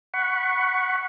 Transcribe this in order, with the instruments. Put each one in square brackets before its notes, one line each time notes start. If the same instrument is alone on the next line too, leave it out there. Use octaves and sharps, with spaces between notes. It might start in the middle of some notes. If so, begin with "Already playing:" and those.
[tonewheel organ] F#5 B5 C#6